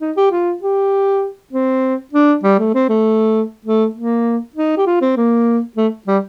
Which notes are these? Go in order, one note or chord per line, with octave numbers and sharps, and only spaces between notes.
D#4
G4
F4
G4
C4
D4
G3
A3
C4
A3
A3
A#3
D#4
G4
F4
C4
A#3
A3
G3